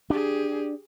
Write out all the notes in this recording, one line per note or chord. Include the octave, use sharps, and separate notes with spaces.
D4 G4 G#4